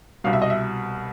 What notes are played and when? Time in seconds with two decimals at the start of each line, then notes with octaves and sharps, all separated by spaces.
0.24 C2 B2 G3 F5
0.33 E5
0.42 D#5
0.50 E5